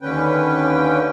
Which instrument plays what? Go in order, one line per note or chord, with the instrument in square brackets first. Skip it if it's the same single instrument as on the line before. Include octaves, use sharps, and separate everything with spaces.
[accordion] D#2 D3 C#4 B4 G5